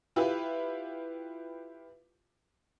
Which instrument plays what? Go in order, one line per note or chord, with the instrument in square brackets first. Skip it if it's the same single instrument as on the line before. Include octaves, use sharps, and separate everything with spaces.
[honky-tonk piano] E4 F4 G4 B4 E5